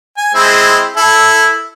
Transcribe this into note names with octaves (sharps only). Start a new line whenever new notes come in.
G#5
G#3 C4 E4
E4 A4